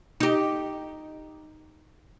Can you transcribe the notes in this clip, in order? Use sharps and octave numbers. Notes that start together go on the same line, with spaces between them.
D#4 G4